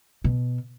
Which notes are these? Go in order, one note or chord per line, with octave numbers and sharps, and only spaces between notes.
B2